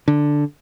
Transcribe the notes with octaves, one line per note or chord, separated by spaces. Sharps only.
D3